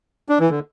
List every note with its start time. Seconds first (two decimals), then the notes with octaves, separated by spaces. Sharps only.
0.29 D4
0.40 E3
0.50 D3